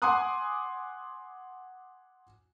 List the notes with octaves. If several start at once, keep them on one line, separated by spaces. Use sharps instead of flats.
F#5 G#5 C6 D6 D#6 F#6